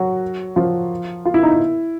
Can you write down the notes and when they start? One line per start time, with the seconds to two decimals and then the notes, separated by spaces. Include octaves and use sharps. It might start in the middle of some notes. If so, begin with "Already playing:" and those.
Already playing: F#3 F#4
0.56 F3 F4
1.25 F4
1.34 E4
1.43 D#4
1.52 E4